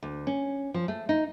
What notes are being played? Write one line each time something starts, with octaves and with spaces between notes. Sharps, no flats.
D2
C#4
F3
A3
D#4